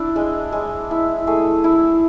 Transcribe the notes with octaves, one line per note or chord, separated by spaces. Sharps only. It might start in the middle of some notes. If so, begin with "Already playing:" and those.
Already playing: D4 E4
G#3
G#3
E4
A3 G#4
E4